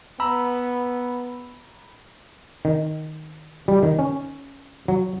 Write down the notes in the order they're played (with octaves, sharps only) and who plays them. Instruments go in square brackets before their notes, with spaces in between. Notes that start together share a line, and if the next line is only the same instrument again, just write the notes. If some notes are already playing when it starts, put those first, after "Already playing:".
[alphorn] B3 [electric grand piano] A#5 B5 E6
[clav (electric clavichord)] D#3
G3
D#3
C#4
F#3